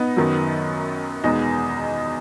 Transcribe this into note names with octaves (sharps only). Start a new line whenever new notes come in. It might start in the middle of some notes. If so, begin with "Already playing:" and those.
Already playing: B3 D#4
F#2 D#3 F#3
E2 B2 G#3 B3 D#4